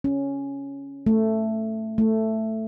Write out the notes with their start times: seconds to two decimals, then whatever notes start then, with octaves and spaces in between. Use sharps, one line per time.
0.04 C#4
1.06 A3
1.98 A3